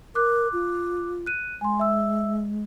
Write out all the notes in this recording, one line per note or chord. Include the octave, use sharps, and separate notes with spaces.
A#4 D6 F#6
F4
F#6 D#7
G#3 G#5 C6
E5 E6